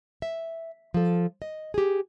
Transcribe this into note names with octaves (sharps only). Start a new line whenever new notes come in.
E5
F3 A4
D#5
G4 G#4